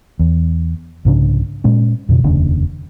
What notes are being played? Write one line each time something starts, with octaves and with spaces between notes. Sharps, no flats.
E2
C2 G#2 C#3 D4
A#2 G#3 C#4
F2 B2 D3
F1 D#2 C#3 D4